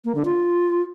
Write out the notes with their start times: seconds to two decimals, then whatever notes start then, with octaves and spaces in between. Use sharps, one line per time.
0.05 A#3
0.15 D3
0.25 F4